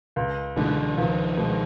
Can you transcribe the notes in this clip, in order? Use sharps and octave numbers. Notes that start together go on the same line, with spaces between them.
C#2
B2 D3 E3 G#3
C#2 D#3 F3
B2 G#3